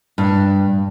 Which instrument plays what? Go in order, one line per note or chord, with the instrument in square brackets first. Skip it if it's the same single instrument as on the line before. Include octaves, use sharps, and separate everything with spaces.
[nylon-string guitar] G2